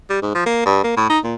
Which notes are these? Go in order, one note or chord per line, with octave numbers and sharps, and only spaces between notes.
G3
G#2
F3
A#3
G2
A#3
A2
D#4
A#2